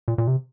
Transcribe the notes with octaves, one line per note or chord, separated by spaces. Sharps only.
A#2
A#2
C3